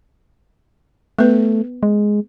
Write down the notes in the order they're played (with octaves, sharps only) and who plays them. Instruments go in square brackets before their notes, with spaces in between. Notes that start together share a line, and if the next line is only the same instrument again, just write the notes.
[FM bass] A3 [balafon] B3 B4
[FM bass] G#3